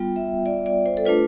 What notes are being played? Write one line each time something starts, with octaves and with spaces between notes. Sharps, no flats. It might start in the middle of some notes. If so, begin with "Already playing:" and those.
Already playing: G3 B3 F4 G5
E5
D5
D5
C5
A4
A3 D4 F4 B4